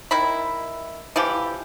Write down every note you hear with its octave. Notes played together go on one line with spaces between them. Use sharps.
D#3 E4 B5
E3 F3 G4